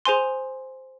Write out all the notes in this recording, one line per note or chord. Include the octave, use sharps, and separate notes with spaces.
G#4 C5 G#5 C6